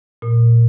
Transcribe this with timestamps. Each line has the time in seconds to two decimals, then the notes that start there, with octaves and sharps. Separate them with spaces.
0.22 A#2